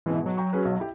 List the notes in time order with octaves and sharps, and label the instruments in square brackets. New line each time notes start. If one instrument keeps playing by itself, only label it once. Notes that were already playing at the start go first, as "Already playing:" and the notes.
[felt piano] G#2 B2 [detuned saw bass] E3
[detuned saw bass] F#3
[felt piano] G5 A#5 C#6
C#4 G#4 B4
B1
E4 G4